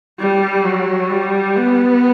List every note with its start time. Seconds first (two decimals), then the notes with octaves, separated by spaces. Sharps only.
0.19 G3
0.65 F#3
1.11 G3
1.57 B3